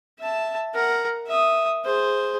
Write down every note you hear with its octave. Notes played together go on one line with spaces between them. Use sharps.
E5 A5
A#4 F#5
E5 D#6
G#4 C5